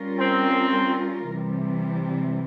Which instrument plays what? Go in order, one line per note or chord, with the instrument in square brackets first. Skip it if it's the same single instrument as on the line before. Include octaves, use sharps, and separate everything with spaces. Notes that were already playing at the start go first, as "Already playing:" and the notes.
Already playing: [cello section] G3 C#4 F4 A#4
[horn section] C4
[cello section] C3 E3 G3